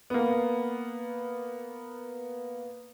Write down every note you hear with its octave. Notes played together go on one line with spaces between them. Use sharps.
A#3 B3